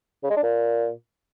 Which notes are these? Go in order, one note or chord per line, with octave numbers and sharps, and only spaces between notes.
C#3
G#3
D4
A#2